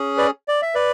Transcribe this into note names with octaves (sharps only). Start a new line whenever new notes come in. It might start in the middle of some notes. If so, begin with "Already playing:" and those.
Already playing: C#4 G#4
B4 D5
D5
E5
B4 D5